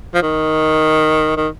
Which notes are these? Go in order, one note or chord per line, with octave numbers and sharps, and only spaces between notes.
F3
D#3
D#3